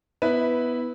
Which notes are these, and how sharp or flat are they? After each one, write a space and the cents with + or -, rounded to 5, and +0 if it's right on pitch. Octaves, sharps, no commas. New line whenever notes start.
B3 +0 E4 -15 B4 +0